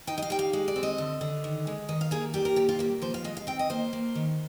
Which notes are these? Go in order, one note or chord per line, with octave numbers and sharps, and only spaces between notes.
D#4 G5
D#5
F5
G3 G5
F5
G#3 F5
D5
C4
D#5
D3
D3
D#3
G#3
D#3 D#5
F5
A#3 G#4
G3 G4
A#4
A#2 G4
F4
A#3 G4
F3 C5
F5
G#3 D#5
F5
C4 G5
D#5
A#3 C5
A#3
D#3